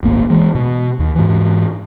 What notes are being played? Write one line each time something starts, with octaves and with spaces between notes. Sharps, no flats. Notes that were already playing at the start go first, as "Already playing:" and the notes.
D#1 G#1 A#3
E3 G#3
B2
D#2
G#2 E3